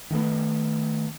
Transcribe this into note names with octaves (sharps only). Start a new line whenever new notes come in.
D#3 A3 B3